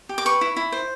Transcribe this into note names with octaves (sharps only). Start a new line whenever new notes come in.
G4
D6
B4 C#6
E4
E4
C5